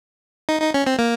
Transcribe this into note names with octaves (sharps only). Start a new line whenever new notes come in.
D#4
D#4
C#4
C4
A#3